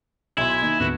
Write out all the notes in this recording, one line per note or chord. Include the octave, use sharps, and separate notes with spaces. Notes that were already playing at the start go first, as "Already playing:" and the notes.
B1 E4 E5 G#5 C6
D#3 A#3 D#4
D2 G#2 D3 B3 F#4 G#6